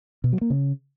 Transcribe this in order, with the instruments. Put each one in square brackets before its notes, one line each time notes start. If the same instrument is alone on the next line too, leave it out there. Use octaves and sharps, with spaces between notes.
[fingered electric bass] B2
F#3
A#3
C#3